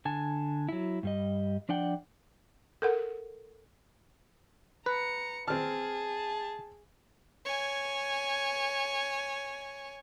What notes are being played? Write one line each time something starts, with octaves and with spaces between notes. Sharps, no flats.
D3 G#5 A5
F#3 E4
G2 G3 D#5
F3 D4 D5 F#5 G5
A4 A#4 F#5
B4 A#5 C#7
C4 G#4 A5 F6
C#5 G#5